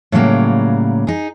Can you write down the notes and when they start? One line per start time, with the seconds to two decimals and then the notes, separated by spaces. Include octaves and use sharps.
0.12 A2 C#3 F#3 G3 A3 A#3
1.07 D#4 G#4